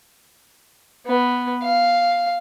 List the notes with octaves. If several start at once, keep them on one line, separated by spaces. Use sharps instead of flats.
B3
F5